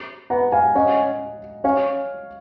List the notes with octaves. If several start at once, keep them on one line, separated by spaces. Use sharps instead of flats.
B3 F#5 A#5
F5 G#5
C#4 D#5 F#5
C#4 C#5 F5